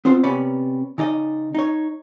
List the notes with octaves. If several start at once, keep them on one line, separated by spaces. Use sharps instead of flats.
B3 C4 F4 C5
C3 B3 C#4 D5 B5
C#3 D#4 D5 D#5
D#4 C#5